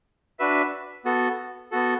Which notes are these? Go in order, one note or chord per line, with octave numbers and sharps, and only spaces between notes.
D4 F#4 B4 E5
B3 F#4 A4
B3 F#4 A4